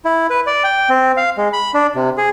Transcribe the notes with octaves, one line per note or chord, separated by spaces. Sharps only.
E4
B4
D5
G5
C4
F5
G#3
B5
D4
C3
G#4